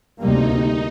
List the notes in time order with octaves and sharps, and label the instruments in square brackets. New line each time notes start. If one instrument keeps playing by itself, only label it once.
[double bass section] D2 C3 G3 A#3 [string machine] D#4